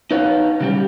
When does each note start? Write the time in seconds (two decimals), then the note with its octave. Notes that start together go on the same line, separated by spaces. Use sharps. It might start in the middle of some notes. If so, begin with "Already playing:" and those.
0.11 D#4 B4 C#5 F5
0.61 C#3 G3 G4